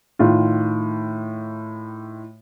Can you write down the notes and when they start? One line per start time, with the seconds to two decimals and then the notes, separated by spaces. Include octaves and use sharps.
0.19 A2 D#3 F4